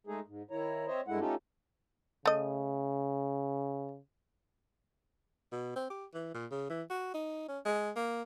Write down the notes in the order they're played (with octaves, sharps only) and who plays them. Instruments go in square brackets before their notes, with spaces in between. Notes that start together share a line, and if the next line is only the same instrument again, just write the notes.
[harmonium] G#3 A3 D#4 G#4
G#2
D#3 E4 C#5 A#5
C4 C5 C#5 D#5 E5
G2 G#3 A3 E4 F#5
A3 C#4 D#4 F4 G4 A4
[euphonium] C#3 [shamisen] A3 D#5
[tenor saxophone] B2
C4
G4
E3
A#2
C#3
E3
F#4
D#4
C#4
G#3
A#3